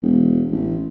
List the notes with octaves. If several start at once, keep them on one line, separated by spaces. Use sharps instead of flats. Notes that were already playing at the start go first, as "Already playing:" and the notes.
E1
A1